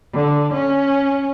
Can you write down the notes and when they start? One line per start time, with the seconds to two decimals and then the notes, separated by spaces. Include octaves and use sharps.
0.14 D3
0.54 C#4